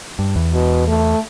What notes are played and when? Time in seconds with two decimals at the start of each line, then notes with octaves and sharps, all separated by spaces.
0.19 G2
0.36 E2
0.53 B2
0.88 A3